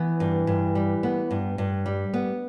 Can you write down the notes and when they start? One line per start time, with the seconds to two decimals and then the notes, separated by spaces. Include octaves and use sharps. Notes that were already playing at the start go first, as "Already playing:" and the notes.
Already playing: E3 B3
0.20 G2
0.47 G2
0.75 G3
1.03 B3
1.31 G2
1.58 G2
1.86 G3
2.14 B3